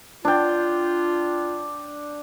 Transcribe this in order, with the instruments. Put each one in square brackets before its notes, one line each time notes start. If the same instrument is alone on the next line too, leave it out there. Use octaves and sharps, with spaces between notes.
[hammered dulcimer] D4 G5 [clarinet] F4